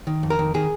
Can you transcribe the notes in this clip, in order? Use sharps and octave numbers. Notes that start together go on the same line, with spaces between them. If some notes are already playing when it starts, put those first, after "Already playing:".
D#3
F2
A#4
D#3
D#3 G#4